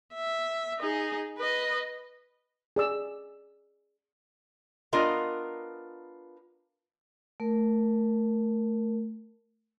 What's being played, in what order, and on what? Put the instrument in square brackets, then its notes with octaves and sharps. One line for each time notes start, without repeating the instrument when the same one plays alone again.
[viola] E5
D#4 G#4
B4 D#5
[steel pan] G#4 D5 E6
[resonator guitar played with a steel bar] B3 D4 F4 A#4 D#5 F5
[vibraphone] A3 A#4